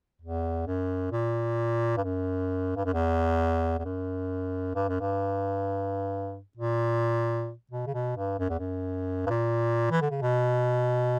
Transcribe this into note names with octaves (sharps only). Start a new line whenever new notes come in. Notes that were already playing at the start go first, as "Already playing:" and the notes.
E2
F#2
A#2
G2
F#2
G2
F#2
E2
E2
F#2
G2
F#2
G2
A#2
B2
C#3
B2
G2
F#2
E2
F#2
G2
A#2
E3
D3
C#3
B2